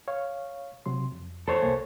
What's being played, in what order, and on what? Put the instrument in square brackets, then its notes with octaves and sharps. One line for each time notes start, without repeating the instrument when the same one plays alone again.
[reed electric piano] C#5 F5 C#6
C3 F#3 C6
F2
[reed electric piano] E2 [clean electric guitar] A4 C5 C#5
[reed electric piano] C2 A#3 G#5